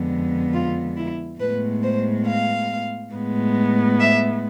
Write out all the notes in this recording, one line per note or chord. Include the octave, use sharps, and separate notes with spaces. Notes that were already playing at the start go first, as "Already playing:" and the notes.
Already playing: F2 D3 G#3 B3
F4
E4
A2 G#3 B3 B4
C5
F5
A2 G#3 B3
E5